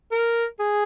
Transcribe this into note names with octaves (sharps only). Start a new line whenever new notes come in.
A#4
G#4